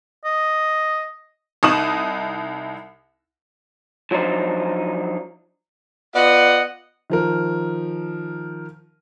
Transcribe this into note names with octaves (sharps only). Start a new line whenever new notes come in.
D#5
C2 D#4 D#6 E7 F#7
F3 F#3 D4 D#4 C5
B3 F4 D5 D#5 F#5
D#3 F3 A#4